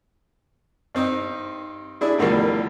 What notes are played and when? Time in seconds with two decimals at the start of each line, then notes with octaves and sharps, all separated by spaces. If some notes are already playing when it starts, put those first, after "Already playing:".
0.95 G2 C4 D#4
2.01 D4 E4 G#4
2.18 E2 A2 D3 D#3 F3 G3